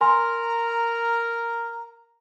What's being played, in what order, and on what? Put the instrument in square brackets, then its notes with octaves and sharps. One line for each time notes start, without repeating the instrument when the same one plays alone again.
[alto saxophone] A#4 [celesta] G#5 C6 [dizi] A#5